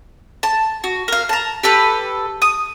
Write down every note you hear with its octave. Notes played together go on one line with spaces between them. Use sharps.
A5
F#4
A#4 F5
A5 A#5
G4 A4 B4
D#6